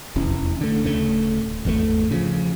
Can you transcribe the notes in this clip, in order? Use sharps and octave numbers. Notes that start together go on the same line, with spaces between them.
F1 E2 E3 C#4
D3 A3
D1 C#3 A3
G#1 E2 D3 A3
C#3 F3